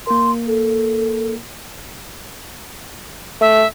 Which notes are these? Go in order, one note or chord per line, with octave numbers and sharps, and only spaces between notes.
A#3 A#4 C6
A4
A3 E5